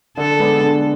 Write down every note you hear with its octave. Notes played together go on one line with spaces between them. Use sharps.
D3 A4
G#3 B3 D4
D3